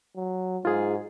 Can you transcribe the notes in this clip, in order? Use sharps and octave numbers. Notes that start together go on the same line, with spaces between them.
F#3
G#2 F4 G#4